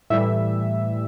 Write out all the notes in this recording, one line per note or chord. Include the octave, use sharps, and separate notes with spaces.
A2 E3 G3 E5